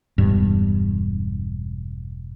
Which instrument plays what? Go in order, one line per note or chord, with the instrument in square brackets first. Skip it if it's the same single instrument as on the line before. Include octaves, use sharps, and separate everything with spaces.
[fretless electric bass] E1 G2